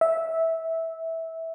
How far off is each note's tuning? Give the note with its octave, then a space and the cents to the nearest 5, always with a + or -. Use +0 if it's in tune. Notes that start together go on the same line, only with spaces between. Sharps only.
E5 -15